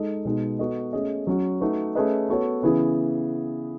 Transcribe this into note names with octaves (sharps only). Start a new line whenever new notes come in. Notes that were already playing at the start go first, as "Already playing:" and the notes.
Already playing: G#3 D#4 A4 D#5
B2 G#3 D#4
B3 F#4 A4 D#5
A3 C#4 G#4 D#5
F#3 C#4 F#4
A3 D#4 F#4 B4
A3 C#4 G#4 B4 D#5
B3 F#4 A4 C#5
C#3 E3 B3 E4 G#4